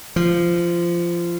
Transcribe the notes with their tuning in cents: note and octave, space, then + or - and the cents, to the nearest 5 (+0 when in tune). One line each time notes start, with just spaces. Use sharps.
F3 -20